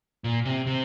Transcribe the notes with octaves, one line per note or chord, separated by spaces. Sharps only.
A#2
C3
C3